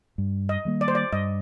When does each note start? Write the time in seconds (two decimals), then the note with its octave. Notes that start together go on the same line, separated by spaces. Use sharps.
0.18 G2
0.49 D#5
0.65 D#3 G3 A#3
0.81 D5
0.88 C5
0.95 D5
1.12 G2 D#5